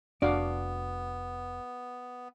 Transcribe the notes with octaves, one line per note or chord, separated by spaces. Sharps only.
F1 B3 D4 F#4 D5 F5 D6